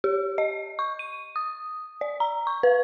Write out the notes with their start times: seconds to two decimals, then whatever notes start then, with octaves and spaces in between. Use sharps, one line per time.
0.04 G4
0.38 D#5
0.79 C#6
0.99 D#7
1.36 D#6
2.01 D5
2.20 A#5
2.47 C#6
2.63 B4